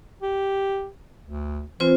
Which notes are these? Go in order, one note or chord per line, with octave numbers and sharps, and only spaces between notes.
G4
D2
E3 C4 F4 C5